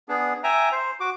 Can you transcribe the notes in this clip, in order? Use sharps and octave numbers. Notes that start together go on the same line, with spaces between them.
B3 D4 G#4
E5 G5 G#5 A#5
C5
F#4 D6